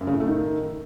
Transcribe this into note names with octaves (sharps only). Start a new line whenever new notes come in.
F#2
C#3
A2
A3
D#3